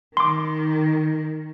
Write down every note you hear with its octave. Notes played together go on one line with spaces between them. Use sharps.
D#3 C6 D6